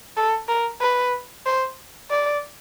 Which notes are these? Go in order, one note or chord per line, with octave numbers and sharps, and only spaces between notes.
A4
A#4
B4
C5
D5